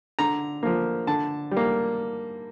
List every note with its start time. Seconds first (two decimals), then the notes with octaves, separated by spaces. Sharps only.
0.19 D3 A#5
0.63 F3 A#3
1.07 D3 A5
1.51 G3
1.57 A#3